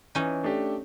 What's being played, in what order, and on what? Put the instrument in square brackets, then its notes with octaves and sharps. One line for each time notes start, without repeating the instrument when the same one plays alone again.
[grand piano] E3 [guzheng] C#4 D#4
[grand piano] A3 D4 G4